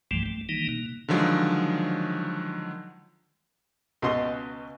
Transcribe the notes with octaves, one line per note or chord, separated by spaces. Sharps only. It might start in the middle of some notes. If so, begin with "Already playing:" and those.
C2 G2 E3 F3 G3 A3
A3
D#3 E3 G3 A#3 D#4
B2 A#3
D3 D#3 F3 F#3 G#3
C#2 B2 F#4 D#5 C6